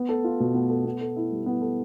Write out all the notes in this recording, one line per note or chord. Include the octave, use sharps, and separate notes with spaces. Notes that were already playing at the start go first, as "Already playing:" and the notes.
Already playing: B3
A4
F4
B2
B3
A4
B3
A4
E4
G3
B3
A4